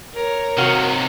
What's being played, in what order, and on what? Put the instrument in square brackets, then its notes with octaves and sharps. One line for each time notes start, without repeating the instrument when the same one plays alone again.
[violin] A#4 C#5
[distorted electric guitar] C3 D#3 [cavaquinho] F#4 F5